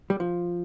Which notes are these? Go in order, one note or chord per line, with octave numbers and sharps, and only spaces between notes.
G3
F3